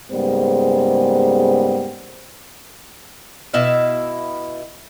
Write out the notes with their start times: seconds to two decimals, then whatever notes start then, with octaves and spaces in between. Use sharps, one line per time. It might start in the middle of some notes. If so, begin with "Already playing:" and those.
0.12 G#2 C#3 G3 A#3 B3 C5
3.54 B2 E4 E5 F5